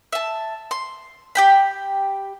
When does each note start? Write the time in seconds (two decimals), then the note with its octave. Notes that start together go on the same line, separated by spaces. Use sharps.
0.12 E5 A5
0.71 C6
1.35 G4 G5 B5